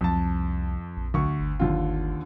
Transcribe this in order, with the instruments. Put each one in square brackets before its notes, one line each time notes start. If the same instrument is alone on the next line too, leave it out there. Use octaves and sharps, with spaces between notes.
[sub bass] C2 [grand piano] F2 A5
[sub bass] A#1
[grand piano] D2 C#6
[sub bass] G1
[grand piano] D#2 D3 F4